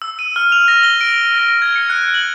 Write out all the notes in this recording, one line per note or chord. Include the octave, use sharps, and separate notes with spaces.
E6
D#7
F6
F7
A#6
G7
D7
A#6
G#6
C#7
F#6
F#7